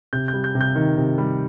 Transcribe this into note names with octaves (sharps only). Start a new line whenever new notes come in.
C3 G6
G6
G3
G6
C3
G6
D#3
C3
G3